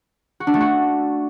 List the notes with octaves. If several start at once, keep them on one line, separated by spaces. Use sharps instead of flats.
F#4
D4
A3
F#4